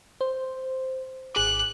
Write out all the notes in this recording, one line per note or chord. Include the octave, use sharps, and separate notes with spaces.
C5
G#1 G#4 D6 F#6